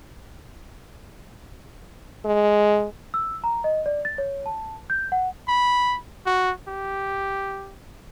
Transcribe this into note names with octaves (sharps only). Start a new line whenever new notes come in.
G#3
E6
A#5
D#5
D5
A6
C#5
A5
G6
F#5
B5
F#4
G4